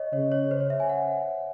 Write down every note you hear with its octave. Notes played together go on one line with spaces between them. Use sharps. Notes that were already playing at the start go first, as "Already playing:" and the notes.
Already playing: C#5 D#5
C#3 C#5
C#5
C5
C#5
E5
G#5
F#5